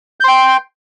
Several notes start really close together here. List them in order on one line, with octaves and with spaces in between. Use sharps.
G6 C6 G5